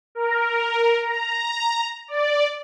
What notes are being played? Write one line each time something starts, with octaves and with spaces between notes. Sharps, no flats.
A#4
A#5
D5